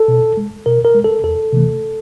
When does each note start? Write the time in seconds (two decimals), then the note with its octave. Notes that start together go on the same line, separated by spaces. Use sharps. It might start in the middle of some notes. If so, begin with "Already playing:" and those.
Already playing: A4
0.08 B2
0.37 G#3
0.66 B2 A#4
0.85 A#4
0.94 G#3
1.05 A4
1.23 E2 A4
1.53 C3 E3 A3